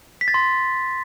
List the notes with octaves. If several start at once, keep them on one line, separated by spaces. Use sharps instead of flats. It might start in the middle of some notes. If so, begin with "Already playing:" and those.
B6
A6
C6